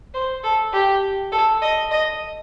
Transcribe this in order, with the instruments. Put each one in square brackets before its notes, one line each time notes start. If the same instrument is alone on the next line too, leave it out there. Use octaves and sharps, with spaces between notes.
[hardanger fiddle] C5
A4
G4
A4
D#5
D#5